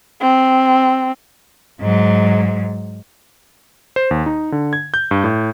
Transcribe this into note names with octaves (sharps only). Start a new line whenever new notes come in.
C4
G#2 F#3
C5
D#2
D#4
D3
G#6
G6
G2
A2